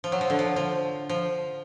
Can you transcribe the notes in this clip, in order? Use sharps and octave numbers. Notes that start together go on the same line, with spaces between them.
F3
F#3
F3
D3
F3
F3
F3